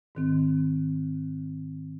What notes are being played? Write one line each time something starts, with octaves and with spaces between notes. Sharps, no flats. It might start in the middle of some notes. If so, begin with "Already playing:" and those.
G#2 D#3 C4